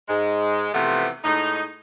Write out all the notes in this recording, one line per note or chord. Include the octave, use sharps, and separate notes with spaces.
G#2 G#3
C3 E3 F3 A3 B3
A2 G#3 D#4